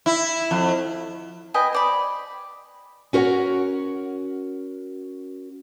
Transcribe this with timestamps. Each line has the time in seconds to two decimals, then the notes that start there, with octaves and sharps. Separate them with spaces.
0.06 E4
0.51 F2
1.54 B4 D#5 G5 G#5
1.73 C5 D5 B5
3.13 C#4 F#4 A#4 C5 C#5 F#5